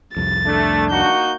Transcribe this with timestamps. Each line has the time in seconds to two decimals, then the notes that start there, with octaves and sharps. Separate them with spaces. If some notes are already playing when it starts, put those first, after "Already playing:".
0.16 C2 F2 A6
0.46 A3 D4
0.91 A#3 D#4 F#4 G6